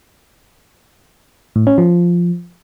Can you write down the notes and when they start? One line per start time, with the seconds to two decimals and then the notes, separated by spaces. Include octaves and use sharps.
1.56 A2
1.67 C#4
1.78 F3